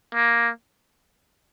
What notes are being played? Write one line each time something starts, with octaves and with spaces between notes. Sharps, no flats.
A#3